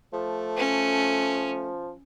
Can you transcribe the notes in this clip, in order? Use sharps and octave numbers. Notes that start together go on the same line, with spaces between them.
F3 A3
C#4